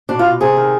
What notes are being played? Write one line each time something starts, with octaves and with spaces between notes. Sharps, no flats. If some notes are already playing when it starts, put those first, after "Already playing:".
B2 D4
F4
B2
C3 G#4
D#3